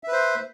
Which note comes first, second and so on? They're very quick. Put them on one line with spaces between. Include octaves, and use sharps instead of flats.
E5 B4 C5